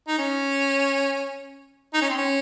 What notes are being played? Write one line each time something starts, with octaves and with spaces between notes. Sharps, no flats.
D#4
C#4
D#4
C#4
C4
C#4